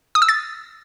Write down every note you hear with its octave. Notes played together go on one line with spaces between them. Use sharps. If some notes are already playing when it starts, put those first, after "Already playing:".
D#6
E6
A6